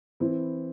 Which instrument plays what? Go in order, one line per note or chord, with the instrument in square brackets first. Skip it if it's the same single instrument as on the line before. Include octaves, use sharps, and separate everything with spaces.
[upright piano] E3 C4 E4